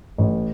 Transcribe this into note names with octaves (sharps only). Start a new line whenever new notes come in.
A1